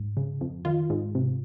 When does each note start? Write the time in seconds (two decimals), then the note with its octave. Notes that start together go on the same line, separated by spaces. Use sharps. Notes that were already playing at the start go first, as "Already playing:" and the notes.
Already playing: G#2
0.17 C#3
0.41 F2
0.65 D#3 F4
0.90 G#2
1.15 C3